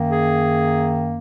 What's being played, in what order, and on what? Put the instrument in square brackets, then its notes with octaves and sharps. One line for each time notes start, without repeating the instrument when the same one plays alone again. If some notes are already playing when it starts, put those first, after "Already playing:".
Already playing: [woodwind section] F#2 D#3 A#3
G#4